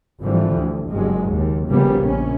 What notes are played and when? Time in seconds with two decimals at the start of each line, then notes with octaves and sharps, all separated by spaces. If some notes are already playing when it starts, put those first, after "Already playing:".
0.21 G#1 D3 E3 F3 G3
0.57 D2
0.90 F#1 G2 F#3 G#3
1.29 D#2
1.69 G1 C#3 F3 G3 A#3 B3
1.99 A#1 C#4